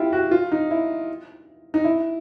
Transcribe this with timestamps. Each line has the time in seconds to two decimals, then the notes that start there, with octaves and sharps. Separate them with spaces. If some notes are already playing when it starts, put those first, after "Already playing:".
Already playing: E4 F4 G4
0.12 F#4
0.31 F4
0.52 D#4
0.71 E4
1.74 D#4
1.84 E4